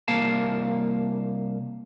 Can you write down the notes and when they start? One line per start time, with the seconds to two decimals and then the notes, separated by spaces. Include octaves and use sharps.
0.08 C2 A#3 F5 A5